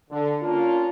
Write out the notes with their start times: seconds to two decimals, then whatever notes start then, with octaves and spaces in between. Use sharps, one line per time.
0.11 D3
0.42 A#3 C#4 D4 F4